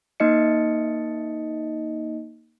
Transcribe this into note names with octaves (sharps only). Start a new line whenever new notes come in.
A#3 D#4 D#5 C#7